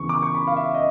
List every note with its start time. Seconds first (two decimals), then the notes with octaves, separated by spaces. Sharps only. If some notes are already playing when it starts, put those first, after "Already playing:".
Already playing: E2 C#3 E3 C#6
0.09 D6
0.23 C#6
0.35 B5
0.47 F5
0.56 E5
0.74 D#5